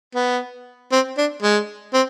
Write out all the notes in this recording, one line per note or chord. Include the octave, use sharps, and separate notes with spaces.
B3
C4
D4
G#3
C4